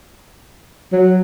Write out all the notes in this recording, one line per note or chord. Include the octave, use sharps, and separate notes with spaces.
F#3